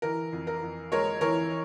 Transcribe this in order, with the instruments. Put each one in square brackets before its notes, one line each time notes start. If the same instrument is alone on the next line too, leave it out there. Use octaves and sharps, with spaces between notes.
[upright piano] E3 A#4
F2
A#4
F2
G#3 A#4 C#5
E3 A#4 C#5